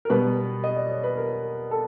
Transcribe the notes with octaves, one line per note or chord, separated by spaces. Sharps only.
A#4
B2 G3 B3 B4
D#5
D5
C#5
B4
A#4
A4